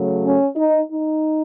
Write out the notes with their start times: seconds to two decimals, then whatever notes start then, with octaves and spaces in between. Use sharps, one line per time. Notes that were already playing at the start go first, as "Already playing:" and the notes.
Already playing: C#3 F#3 A3
0.22 C#4
0.56 D#4
0.89 D#4